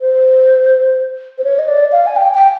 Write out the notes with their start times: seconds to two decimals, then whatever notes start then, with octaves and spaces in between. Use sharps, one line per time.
0.01 C5
1.38 C5
1.44 C#5
1.59 D#5
1.68 D5
1.92 F5
2.06 G#5
2.16 G5
2.34 G5